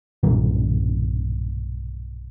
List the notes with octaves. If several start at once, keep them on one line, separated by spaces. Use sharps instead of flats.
B1 G2 A#2 D#3